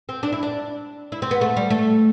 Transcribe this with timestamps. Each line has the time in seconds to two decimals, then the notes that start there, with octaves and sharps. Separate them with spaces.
0.09 C4
0.23 D4
0.33 E4
0.43 D4
1.12 E4
1.22 C4
1.31 B3
1.41 A3
1.57 G3
1.70 A3